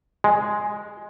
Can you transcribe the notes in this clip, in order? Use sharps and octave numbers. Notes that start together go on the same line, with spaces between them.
G#3